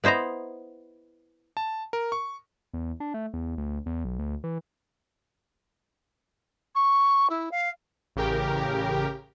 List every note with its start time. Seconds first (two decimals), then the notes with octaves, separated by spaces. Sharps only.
0.04 B3 E4 C5 D#5 A#5
1.57 A5
1.93 A#4
2.12 C#6
2.73 E2
3.00 D4
3.14 A3
3.34 E2
3.58 D2
3.86 E2
4.05 B1
4.19 D2
4.44 E3
6.75 C#6
7.29 E4
7.51 F5
8.16 A1 C#3 G4 A#4 G5